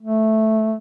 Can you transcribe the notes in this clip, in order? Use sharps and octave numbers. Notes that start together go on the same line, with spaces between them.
A3